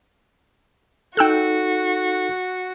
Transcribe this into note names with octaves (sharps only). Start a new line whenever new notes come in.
D#4 F#4 A4 G5 E6 F#6